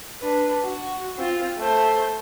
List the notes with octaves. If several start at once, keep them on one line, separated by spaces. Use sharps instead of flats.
D4 B4
F#4
C4 F4
A3 C5